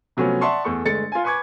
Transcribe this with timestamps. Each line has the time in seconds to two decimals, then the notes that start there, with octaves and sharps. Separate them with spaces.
0.17 C3 F3 F#3 A3 B3 C#4
0.41 D5 E5 F#5 A5 C6 C#6
0.64 E2 A3 A4 C#6
0.85 G1 G#3 A3 A6 C#7
1.12 F4 G#5
1.24 B4 G#5 B5 C#6 D6 G#6